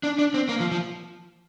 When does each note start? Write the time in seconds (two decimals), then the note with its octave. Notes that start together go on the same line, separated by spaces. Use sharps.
0.03 D4
0.19 D4
0.34 C4
0.49 A#3
0.60 F3
0.71 F3